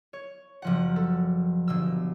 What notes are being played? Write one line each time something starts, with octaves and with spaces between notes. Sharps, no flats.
C#5
F#1 F3 F#5
A4
G1 B2 E6